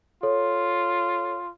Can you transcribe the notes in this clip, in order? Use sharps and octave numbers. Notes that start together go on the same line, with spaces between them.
F4 A4 C#5